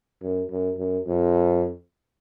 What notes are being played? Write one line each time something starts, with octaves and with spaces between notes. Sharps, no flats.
F#2
F#2
F#2
F2